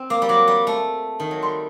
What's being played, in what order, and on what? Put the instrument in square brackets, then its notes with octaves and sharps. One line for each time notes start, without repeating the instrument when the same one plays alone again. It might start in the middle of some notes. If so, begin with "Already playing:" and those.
Already playing: [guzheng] C4
[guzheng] A#3 [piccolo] D6
[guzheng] G3
[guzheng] F#3 [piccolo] D6
[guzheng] G3
A3
D#3
F#3
[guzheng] G3 [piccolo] C6